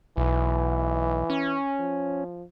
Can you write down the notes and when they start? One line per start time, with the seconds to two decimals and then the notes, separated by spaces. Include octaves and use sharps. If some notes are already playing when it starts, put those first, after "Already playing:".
0.17 B1 E3
1.30 C#4
1.79 F3